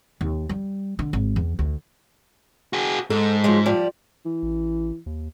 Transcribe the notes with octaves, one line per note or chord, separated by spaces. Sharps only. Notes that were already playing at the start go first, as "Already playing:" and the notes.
D#2
G3
D3
G#1
E2
D2
F#4 G#4
G#2 A4
F3 F#3 G#3
F3 G3 D5
E3
A1
D#2